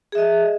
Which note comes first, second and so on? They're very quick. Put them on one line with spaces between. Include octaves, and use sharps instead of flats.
G#4 E5 D#5